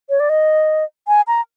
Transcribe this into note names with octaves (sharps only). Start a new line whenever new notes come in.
C#5
D5
D#5
G#5
A#5